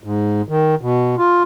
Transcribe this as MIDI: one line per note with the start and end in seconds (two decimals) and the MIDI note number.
0.04 0.42 44
0.49 0.75 51
0.81 1.15 47
1.18 1.43 65